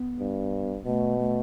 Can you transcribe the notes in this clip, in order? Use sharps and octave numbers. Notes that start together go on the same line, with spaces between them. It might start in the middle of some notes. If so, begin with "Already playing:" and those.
Already playing: B3
G2
B2 A3
A3